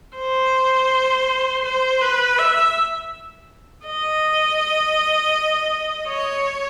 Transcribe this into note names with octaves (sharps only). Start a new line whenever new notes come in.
C5
C5
B4
E5
D#5
C#5